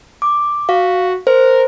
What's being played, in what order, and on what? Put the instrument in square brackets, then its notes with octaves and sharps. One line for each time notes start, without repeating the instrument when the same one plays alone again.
[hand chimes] D6
[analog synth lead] F#4 [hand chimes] F5
[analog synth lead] A#4 [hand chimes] C5